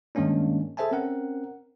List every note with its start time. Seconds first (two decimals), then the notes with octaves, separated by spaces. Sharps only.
0.15 G2 D#3 G#3 A#3 C#4 D4
0.77 G#4 A4 C5 E5 G#5 A5
0.91 C4 C#4 A#4 F#5